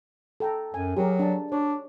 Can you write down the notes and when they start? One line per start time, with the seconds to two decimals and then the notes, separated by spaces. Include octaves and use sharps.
0.40 A4 G5 A#5
0.74 F#2 G#5
0.97 F#3 G4 G#4 A#4
1.19 D4 A5
1.52 D4 C#5